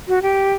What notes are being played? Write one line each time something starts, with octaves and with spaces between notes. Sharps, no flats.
F#4
G4